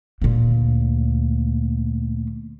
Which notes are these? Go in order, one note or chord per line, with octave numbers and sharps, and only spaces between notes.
D2 A#2